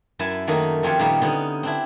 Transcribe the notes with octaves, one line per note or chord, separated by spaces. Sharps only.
F#2 E4 E5 G#5 A5
D#3 F#3 A3 A#3 D#4
F2 C4 C#4 F4 G4 C#5
A#2 D#3 G3 A#3 B3 G4
D3 B3 C#4 D#4
C4 D4 E4